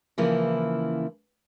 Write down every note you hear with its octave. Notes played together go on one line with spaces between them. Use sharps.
C#3 E3 F3 A#3 E4